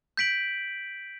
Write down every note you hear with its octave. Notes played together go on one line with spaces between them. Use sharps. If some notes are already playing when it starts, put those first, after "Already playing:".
G6 B6 D7 F#7